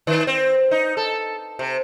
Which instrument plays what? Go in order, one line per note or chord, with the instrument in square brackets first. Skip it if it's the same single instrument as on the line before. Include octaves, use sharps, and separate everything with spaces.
[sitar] D#3
C4
D#4
A4
C3